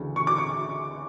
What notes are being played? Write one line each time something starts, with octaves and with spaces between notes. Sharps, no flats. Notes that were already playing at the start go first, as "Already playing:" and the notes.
Already playing: D2 C#3 E3
C#6
D6
C#6